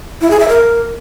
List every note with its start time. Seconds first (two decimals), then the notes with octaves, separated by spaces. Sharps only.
0.21 E4
0.31 G#4
0.40 E5
0.49 A#4